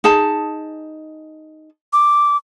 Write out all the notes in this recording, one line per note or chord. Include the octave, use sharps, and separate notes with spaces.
D#4 G#4 A5
D6